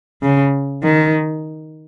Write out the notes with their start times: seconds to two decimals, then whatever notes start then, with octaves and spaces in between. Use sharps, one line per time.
0.22 C#3
0.83 D#3